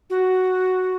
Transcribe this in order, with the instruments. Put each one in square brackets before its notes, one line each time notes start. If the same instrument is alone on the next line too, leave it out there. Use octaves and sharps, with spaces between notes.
[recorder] F#4